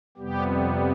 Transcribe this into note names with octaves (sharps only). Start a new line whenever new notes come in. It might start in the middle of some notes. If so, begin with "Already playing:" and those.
F2 C3 G3 B3 G4